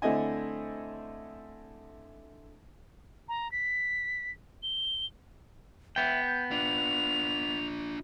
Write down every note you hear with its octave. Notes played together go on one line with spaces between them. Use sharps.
D3 A3 C4 E4 D#5 G#5
A#5
B6
G7
B3 E5 G5
G6
D4 F4 F7